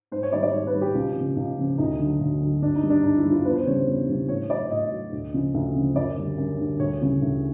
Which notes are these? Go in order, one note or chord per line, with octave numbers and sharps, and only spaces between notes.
G#2 C5
C#5
D#3 G3 D5
D5
G#2 C#5
B4
D#3 G3
G4
C#2
C#3 F3
C#2
C#3 F3
D2 D#4
D3 F#3
D2
D3 F#3
G2 D4
D#4
D#3 G3
D4
G2 D#4
E4
D#3 G3
F4
E2 B4
C5
C#3 E3 G3 C#5
C5
E2
C#3 E3 G3
A2 C#5
F#3 D5
A2 D#5
F#3
D2
C#3 F3
D2
C#3 F3
F#2 D5
D3 G3
F#2
D3 G3
D2 C#5
C#3 E3 G3
D2